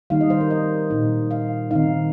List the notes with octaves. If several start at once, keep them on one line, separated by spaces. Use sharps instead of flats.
D#3 G3 A#3 D#4 F5
D#5
C5
A#4
D#5
A#2 G3 D#4
F5
D#3 C4 D#4 F5